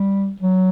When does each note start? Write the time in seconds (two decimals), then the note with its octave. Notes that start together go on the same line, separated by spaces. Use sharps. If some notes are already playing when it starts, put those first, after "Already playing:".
Already playing: G3
0.40 F#3